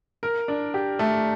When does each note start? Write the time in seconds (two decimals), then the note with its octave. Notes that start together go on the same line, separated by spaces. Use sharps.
0.23 A#4
0.48 D4
0.74 G4
0.99 A3